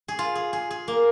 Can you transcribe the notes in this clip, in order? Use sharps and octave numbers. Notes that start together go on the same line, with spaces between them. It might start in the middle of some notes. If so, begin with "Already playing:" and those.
G#4
F4
G#4
G#4
G#4
A#3